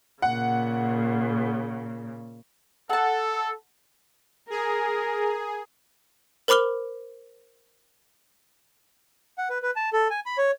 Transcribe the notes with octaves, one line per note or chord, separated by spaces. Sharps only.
A#2 C#3 F#5
A4 F#5 A5
G#4 A#4
A#4 C5 B5 D6 F6 G7
F#5
B4
B4
A5
A4
G#5
B5
C#5